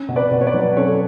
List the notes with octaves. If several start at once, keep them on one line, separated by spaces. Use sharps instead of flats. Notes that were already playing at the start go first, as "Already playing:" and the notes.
Already playing: C#4
B2
B4 D5
B2
C#5
B4 D5
F#3
C#4 A4 C#5